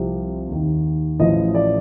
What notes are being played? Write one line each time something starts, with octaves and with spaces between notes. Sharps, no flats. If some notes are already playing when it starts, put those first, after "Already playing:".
Already playing: C2 C3 F3
D#2 D#3
A1 A2 F3 D#5
D5